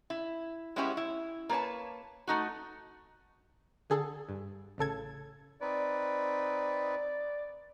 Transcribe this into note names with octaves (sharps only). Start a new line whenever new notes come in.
E4
G#3 B3 C#4 E4 G4 C#5
E4
A#3 A4 B4 C#5 A5
A3 D#4 F#4
D3 G#4 A4
G2
A1 C#3 A4 G#6
C4 D#4 B4 D5